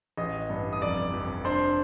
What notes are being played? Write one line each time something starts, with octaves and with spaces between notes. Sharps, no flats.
A1 D#5 D#6
G2
D#6
F1 D5 D6
F2
D4 C5 C6